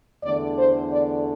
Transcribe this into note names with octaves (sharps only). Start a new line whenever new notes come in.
E2 D3 A3 D5
C5
D5